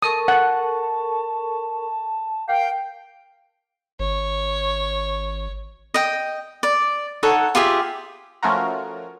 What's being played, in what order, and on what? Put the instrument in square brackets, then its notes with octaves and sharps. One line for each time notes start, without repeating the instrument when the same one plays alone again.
[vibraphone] A4 A#4 C#6 [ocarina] A5 [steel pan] D#6
[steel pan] F#5
[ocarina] A#4 [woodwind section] F5 G5
[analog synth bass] G#1 [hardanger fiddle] C#5
[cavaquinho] D#5 G5
D5
D#4 A4 C#5 F#5
F4 G4 G#4 E5
[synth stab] F3 A3 C#4 F4 F#4 A#4